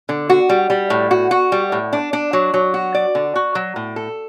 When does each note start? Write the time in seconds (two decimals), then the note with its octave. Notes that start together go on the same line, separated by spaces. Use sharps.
0.09 D3
0.30 F#4
0.49 G3
0.70 G3
0.90 A2
1.11 F#4
1.31 F#4
1.52 G3
1.72 A2
1.93 D4
2.13 D4
2.33 F#3
2.54 F#3
2.74 F#4
2.95 D5
3.15 D3
3.36 F#4
3.55 F#3
3.76 A2
3.96 A4